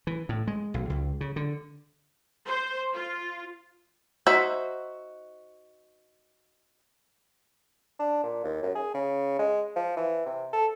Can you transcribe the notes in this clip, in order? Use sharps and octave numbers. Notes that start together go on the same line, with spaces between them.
E3
A2
G#3
B1
C#2
C#3
D3
C5
F4
D#4 F#4 C5 E5
D4
A#2
D#2
F#2
G#4
C#3
G#3
F3
E3
C3
A4